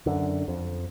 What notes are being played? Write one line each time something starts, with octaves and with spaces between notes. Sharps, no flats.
F#2 D3
F2